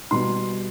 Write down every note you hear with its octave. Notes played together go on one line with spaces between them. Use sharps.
B2 G3 C6